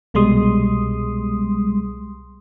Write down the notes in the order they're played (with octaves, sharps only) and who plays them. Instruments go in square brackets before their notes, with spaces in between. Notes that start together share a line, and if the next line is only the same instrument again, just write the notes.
[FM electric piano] C2 B2 G3 G#3 C6 D#6